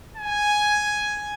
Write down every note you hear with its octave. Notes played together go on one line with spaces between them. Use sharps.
G#5